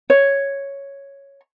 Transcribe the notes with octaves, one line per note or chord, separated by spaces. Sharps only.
C#5